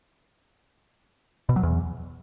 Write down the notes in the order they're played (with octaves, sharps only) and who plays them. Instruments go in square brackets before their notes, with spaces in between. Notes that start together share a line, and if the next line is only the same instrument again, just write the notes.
[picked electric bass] B2
F#3
E2